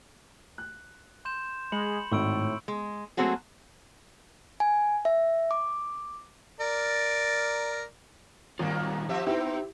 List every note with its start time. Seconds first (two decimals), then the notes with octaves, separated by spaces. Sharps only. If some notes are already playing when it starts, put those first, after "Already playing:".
0.58 F#6
1.25 C6 G6 E7
1.72 G#3 B5 C#7 F#7
2.12 G#1 A2 C#6 E6 D7
2.68 G#3
3.17 F#3 A3 A#3 C4 F#4 G#4
4.60 G#5
5.05 E5
5.51 D6
6.60 A#4 D5
8.59 G#1 D#2 D#3 G3 A#3 F4
9.09 F3 C4 G4 E5
9.26 B3 C4 D#4 E4 G4